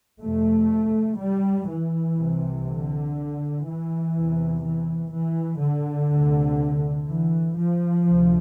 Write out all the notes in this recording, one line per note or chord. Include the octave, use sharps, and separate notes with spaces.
F2 C3 A3
G3
E3
C2 C3
D3
E3
E2 C3
E3
E3
D3
D2 C3
E3
F3
D2 C3